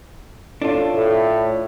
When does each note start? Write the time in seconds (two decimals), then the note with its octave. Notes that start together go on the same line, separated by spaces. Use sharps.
0.62 D4 E4 F4 A4 C#5
0.94 A2 A4 E5